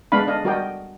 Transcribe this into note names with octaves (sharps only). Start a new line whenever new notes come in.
G#3 B3 D4 F5 B5
D4 D#5 F5
G3 F#4 A#4 D5 D#5 G5